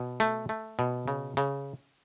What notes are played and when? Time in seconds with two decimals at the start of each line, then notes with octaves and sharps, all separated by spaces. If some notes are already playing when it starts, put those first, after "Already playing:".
Already playing: B2
0.20 A3
0.49 A3
0.79 B2
1.08 C#3
1.37 C#3